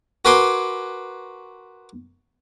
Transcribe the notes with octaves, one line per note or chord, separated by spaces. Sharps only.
F#4 A#4 B4 G#5 C6 D6